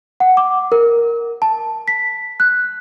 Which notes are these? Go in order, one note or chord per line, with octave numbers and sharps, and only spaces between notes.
F#5
D6
A#4
A5
B6
F#6